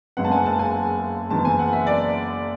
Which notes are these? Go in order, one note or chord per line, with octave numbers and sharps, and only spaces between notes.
F#1 F#2 C#3 G#3 B3 F#5
A5
G#5
A5
G#5
F#1 F#2 E3 B3 A5
G#5
F#5
E5
D5